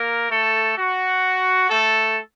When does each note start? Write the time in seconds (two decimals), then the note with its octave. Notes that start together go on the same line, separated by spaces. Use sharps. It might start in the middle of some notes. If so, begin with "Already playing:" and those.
Already playing: A#3 A#4
0.30 A3 A4
0.77 F#4
1.70 A3 A4